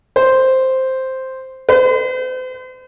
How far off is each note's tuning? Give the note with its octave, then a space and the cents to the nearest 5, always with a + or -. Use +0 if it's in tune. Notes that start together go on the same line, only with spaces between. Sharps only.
C5 +0
C5 -40